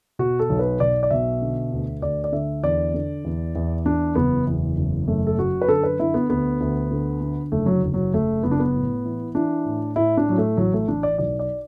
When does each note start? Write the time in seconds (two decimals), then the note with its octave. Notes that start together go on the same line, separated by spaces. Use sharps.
0.19 B2 F#4
0.39 A4
0.50 B1
0.59 B4
0.80 B1 D5
1.03 D5
1.11 B2 E5
1.42 D3
1.72 D2
2.02 D2 D5
2.24 D5
2.32 D3 E5
2.63 E2 D5
2.94 D3
3.25 E2
3.56 E2
3.85 E2 D4
4.15 F#1 B3
4.47 E2
4.77 F#1
5.08 F#2 A3
5.27 A4
5.38 F#2 F#4
5.62 B4
5.68 D3 A4
5.83 B4
5.99 D3 E4
6.14 B3
6.30 D2 B3
6.61 D2
6.91 D3
7.21 D3
7.52 F#1 A3
7.66 F#3
7.83 F#1
7.94 F#3
8.14 F#1 A3
8.43 F#1 B3
8.51 D4
8.60 B3
8.75 A2
9.05 E3
9.35 E3 D4
9.65 A2
9.96 A2 E4
10.17 D4
10.27 A2 F#3
10.38 A3
10.57 A1 F#3
10.73 A3
10.88 A1 D4
11.03 D5
11.18 B1 D5
11.39 D5